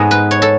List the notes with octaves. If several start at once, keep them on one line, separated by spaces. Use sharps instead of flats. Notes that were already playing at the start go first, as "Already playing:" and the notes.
Already playing: G#2 G#3 B3 A4
B4
C#5
A4